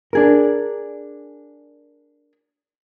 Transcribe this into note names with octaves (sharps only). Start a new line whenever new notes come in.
D4 G#4 A#4